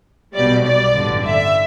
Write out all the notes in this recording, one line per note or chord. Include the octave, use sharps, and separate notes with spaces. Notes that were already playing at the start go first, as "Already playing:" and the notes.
B1 B2 G3 D5
D5
A1 G2 D3
E5